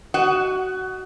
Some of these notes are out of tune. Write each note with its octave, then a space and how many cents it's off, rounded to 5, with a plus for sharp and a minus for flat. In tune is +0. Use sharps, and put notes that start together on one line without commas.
F#4 +20 D#5 +0 F#5 +0